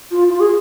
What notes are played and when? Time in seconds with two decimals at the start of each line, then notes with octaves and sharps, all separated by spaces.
0.11 F4
0.29 F4
0.40 G#4